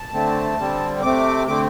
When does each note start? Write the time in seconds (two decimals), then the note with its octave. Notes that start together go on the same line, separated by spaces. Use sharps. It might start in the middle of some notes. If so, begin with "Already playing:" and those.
Already playing: A5
0.13 D3 A3 C4
0.58 D3 G3 C4
1.03 C3 A3 C4 D6
1.48 D3 A3 C4 D6